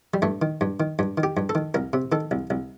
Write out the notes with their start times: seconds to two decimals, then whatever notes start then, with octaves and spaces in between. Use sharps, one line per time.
0.14 G3
0.22 G2 A3
0.42 D#3
0.61 G2
0.80 D#3
0.99 G2
1.18 D#3
1.23 G4
1.37 G2
1.49 A4
1.55 D#3
1.74 C2 A#4
1.93 C3
2.12 D#3 A4
2.31 C2
2.50 C2